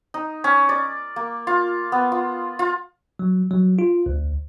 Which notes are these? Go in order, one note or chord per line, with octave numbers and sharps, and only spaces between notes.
D#4
C#4
D5
A#3
F4
B3
F4
F4
F#3
F#3
F4
D2